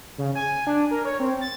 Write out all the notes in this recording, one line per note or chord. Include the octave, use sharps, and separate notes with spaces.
C#3
G#5
D4
A#4
C#5
C4
A6